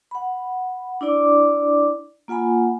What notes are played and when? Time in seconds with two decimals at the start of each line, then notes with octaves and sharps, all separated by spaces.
0.11 F#5 B5
1.01 D4 E4 D5 D6
2.28 A#3 F4 F#5 G#5 B5